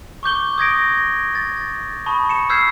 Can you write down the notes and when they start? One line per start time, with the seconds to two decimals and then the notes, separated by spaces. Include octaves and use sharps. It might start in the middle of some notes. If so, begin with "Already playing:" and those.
0.23 C#6 D6 G6 G7
0.58 D#6 G#6 A#6 D7
1.35 A6
2.06 A5 B5 C#6 D#6
2.29 C#7 E7
2.50 E6 F6 G6 G#6 B6 C7